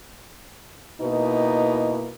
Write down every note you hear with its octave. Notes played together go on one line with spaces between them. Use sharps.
B2 A#3 D#4 E4